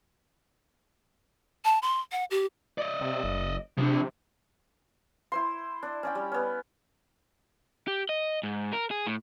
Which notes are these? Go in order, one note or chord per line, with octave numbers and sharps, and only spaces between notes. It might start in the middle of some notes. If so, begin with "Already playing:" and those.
A5
C6
F#5
G4
D5 D#5
C3
F#1
C3 F3 D4
E4 C5 C6
D4
C#4 D5 G5
G3
B3 C#4
G4
D#5
G#2
A#4
G#4
A2